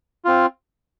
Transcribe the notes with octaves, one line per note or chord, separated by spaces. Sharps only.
C4 F4